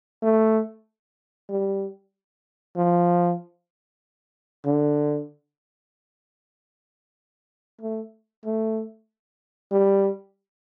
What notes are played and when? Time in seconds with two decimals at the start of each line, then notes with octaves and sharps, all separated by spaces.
0.23 A3
1.49 G3
2.76 F3
4.66 D3
7.82 A3
8.45 A3
9.72 G3